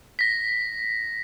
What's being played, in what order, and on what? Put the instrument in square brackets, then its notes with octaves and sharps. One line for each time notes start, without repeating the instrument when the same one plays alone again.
[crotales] A#6 B6